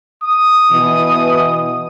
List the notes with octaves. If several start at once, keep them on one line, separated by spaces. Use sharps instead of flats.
D#6
B2 E3